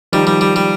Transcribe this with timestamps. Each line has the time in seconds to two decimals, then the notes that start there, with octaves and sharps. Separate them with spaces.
0.12 D#3 F3 G3
0.27 G3
0.41 G3
0.56 G3